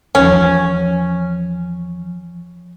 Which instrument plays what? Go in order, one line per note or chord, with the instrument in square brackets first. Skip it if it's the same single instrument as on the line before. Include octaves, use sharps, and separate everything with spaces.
[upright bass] E2 F3 [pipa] C#4